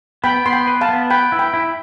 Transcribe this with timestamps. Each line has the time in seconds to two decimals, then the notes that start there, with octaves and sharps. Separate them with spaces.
0.24 B3 G5 B5
0.46 B3 C6
0.53 G5 B5
0.67 B4
0.81 F5 A5
0.89 B3
1.10 B4 G5 B5
1.32 E4
1.39 G5 B5
1.54 E4